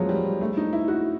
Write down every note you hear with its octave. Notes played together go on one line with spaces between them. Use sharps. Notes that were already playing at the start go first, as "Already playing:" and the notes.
Already playing: F3 F#3 G#3 A3 B3
G3
A3
D#4
E4
F#4